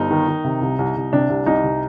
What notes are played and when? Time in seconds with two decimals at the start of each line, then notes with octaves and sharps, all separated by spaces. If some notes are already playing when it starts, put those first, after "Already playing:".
Already playing: G1 D#4
0.11 D#3
0.28 D#3
0.44 C3
0.61 C2
0.79 C2
0.96 C2
1.13 C3 D4
1.29 C2
1.46 C2 D#4
1.64 C3